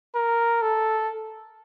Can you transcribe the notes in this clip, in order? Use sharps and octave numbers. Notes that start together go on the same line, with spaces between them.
A#4
A4